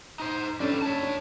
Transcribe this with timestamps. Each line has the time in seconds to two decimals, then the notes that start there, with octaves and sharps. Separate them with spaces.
0.20 D#4 C5
0.60 G3 C#4 D4 A4
0.82 C#5 A5
1.03 D4